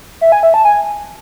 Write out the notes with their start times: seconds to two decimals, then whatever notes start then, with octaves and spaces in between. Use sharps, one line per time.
0.21 E5
0.32 G#5
0.43 E5
0.54 A5
0.65 G#5